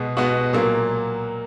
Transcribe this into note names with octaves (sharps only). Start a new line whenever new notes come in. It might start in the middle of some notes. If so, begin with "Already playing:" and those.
Already playing: B2 G#3 B3
B2 G#3 B3 F#4
A#2 F#3 A#3